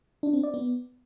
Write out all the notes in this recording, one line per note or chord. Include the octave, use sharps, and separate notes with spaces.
D4
C4
D5
B3